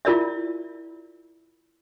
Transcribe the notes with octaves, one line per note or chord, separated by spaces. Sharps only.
E4 F4 A#4 D5 E5